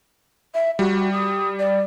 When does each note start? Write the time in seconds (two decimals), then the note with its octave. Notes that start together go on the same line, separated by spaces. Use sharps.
0.54 E5
0.79 G3 F#4
1.12 D#6
1.59 D5